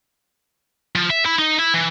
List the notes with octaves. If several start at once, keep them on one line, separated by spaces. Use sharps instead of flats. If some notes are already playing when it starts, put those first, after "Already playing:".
F3
E5
E4
D#4
E4
E3